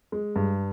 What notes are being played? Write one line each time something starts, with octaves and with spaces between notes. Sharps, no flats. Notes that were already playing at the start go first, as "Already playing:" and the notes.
G#3
G2